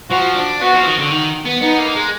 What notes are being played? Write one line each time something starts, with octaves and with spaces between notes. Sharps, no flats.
F3 F#4
D4
B3 F#4
F3
D#3
D3
D#3
B3
B3 D#4
A#3
G#3